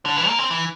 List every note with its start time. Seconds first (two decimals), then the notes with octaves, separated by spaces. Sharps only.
0.05 D3
0.16 E3
0.28 A#3
0.39 C4
0.51 E3